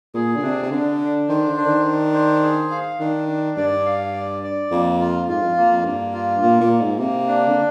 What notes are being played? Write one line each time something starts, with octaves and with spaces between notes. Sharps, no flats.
A#2 G#4
D3
C3 D4
C3
D3 D4
D4
D#3 C5
D3
D4
D#3
D4
C5
G#4
F5
D#3 D4
D4
G2 D5
F5
D5
D5
F2 A#3
F4
G#2 F4
F2
A#3
F2
G2 A#3
F4
A#2 A#3
A#2
A#3
G#2
C3 A#3
D4
D3